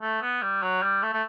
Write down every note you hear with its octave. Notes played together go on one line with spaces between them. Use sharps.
A3
B3
G3
F#3
G3
A3
A3